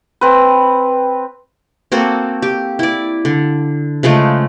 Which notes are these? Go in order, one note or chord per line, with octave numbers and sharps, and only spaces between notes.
C4 B4
A#3 C4 F#4 A4
G4
E4 D5
D3
C#3 F3 G#3 A3